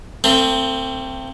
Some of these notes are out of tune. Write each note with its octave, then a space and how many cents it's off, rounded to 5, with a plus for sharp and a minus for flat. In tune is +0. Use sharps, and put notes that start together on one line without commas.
A3 +45 C4 +0